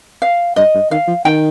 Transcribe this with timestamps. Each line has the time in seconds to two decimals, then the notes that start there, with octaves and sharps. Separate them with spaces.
0.22 F5
0.56 G2 D#5
0.74 G2
0.91 D#3 F5
1.07 F3
1.25 D#3 G5